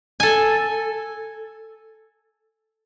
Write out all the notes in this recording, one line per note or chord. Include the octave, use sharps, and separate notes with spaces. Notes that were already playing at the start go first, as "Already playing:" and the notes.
A4 G#5